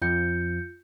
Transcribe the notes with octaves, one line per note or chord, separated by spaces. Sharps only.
F2 F3 F4 G6 C#7